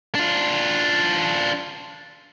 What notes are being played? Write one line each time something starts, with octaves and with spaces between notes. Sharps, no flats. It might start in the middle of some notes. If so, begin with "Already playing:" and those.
D4 F4